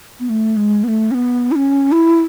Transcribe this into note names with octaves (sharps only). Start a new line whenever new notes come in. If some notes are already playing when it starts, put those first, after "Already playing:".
B3
A3
G#3
B3
A3
C#4
B3
E4
C#4
E4